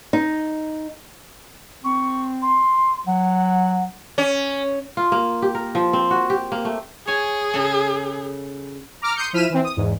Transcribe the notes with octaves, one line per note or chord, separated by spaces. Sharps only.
D#4
C4 C#6
C6
F#3 F#5
C#4
F4
A#3
G4
A#4
F3
C4
F#4
G4
A#3
A3
G#4 C#5 G#5
C#3 A4
A#5 D6 F6
C6 D#6 G6 C#7
F3 E4 F6 B6 D#7 E7
E3 C4
D#6
E2 G#2